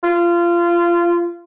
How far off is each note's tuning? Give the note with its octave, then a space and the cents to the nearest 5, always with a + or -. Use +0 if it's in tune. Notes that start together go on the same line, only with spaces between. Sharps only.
F4 -25